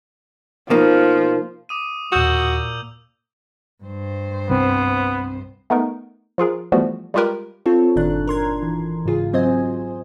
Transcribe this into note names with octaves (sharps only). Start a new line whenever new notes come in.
B2 F3 A#3 D#4
D6 D#6 D#7
D#2 A#2 F#4 D#6 E6 G6 F7
G2 C5
C2 B3 C4
A3 B3 D#4 A#4
F3 F4 G#4 A#4
E3 F3 G3 A3 B3 F#4
G3 G#3 F4 G4 A#4 B4
C4 F4 A4 C#5
G1 A#2 D#3 D4 F#6
A#4 C6 G#6
E3
G#2 C#3 F4 G#4
F#3 C4 C5 D#5 G#5